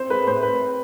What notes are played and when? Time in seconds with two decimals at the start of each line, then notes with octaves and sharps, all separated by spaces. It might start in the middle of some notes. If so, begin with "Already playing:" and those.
Already playing: C4 C5
0.09 G#3 B4
0.26 A2 C5
0.42 C4 B4